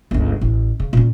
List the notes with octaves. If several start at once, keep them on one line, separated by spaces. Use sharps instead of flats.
G1 C#2
A1
C#3
A#2 C#4